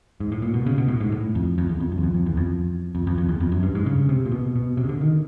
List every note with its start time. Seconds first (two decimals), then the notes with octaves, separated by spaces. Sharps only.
0.20 G#2
0.32 A2
0.42 A#2
0.54 B2
0.66 C#3
0.78 B2
0.88 A2
1.01 G#2
1.12 A2
1.35 F2
1.58 F2
1.69 E2
1.80 F2
1.92 F#2
1.98 E2
2.03 F2
2.14 F2
2.26 E2
2.37 F2
2.95 F2
3.07 F2
3.18 F2
3.29 E2
3.40 F2
3.52 F#2
3.63 G2
3.75 G#2
3.86 C#3
4.09 C3
4.25 A#2
4.32 B2
4.56 B2
4.77 C3
4.84 C#3
4.89 D3
5.01 D#3